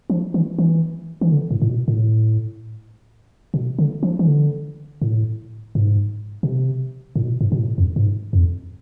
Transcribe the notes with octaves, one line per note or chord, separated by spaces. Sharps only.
F3
E3
E3
E3
D3
A2
A2
B2
A2
B2
D3
F3
E3
D3
A2
G#2
B2
C3
A2
B2
G#2
B2
A2
F2
G#2
F2